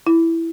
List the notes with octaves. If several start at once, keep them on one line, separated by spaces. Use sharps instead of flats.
E4